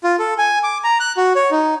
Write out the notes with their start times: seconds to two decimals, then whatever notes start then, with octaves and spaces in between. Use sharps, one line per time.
0.04 F4
0.19 A4
0.38 G#5
0.64 D6
0.84 A#5
1.00 F#6
1.17 F#4
1.36 C#5
1.51 D#4